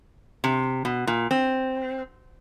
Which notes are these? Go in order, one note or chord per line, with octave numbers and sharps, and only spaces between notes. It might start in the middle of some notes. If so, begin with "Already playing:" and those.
C3
B2
A#2
C4